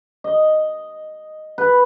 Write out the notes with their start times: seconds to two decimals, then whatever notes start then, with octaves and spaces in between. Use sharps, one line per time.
0.24 D#5
1.58 B4